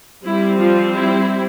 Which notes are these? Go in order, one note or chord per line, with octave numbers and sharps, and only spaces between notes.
G3 C4 E4
F3 F4
E4